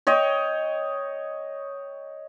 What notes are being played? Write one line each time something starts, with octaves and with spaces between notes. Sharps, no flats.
C#5 D#5 G5